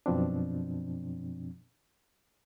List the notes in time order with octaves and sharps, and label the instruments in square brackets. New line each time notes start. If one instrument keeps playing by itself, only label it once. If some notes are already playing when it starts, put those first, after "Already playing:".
[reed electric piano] F#2 B2 F3 C4 D4